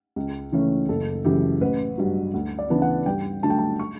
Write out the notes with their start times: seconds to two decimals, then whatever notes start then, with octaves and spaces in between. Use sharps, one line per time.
0.16 C#2
0.52 C#3 E3 A3 C#4
0.89 F#1 A4
1.25 F#2 C#3 E3 G4
1.61 A1 B4
1.98 G2 F#3
2.34 D2
2.59 D5
2.70 C#3 E3 B3 D4
2.82 F#5
3.06 G2 G5
3.43 D3 F#3 A3 D4 A5
3.50 G5
3.59 A5
3.79 C#6